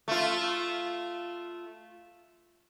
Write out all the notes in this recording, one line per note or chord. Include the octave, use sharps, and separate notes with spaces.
A3 F4